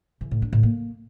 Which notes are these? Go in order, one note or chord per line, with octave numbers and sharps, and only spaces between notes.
E3
A2
D4
A2
A#3